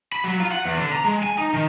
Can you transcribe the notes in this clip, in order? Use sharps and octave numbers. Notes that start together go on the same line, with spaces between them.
B5
F#3
F4
F#5
E2
D3
A#5
G#3
G#5
D#4
D#3